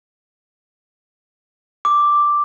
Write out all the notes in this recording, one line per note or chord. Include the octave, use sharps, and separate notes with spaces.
D6